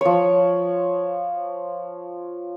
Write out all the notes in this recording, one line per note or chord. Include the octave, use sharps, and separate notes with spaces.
F3 C#5